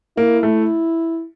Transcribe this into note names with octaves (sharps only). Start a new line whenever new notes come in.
A#3 E4
A3